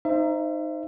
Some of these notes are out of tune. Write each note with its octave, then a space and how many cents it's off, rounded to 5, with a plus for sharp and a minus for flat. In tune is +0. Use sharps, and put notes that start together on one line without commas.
D#4 +0 C5 +0 E5 +35